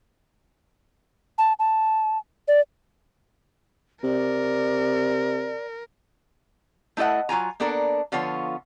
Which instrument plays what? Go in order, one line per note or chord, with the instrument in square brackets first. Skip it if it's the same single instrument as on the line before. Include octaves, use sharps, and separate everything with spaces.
[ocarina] A5
A5
D5
[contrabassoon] C3 [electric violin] A#4 [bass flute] D5
[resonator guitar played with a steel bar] A3 E4 A4 D#5 F#5
F#3 F4 G#5 A#5
A#3 B3 D4 A4 A#4
D3 F3 B3 F4 C#5